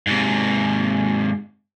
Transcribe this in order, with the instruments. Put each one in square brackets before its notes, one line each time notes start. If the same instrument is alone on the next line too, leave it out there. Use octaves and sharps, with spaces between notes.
[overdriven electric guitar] G#2 C3